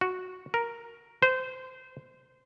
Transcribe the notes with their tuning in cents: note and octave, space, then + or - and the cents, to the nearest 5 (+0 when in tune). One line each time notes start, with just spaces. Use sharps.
F#4 -5
A#4 +5
C5 -25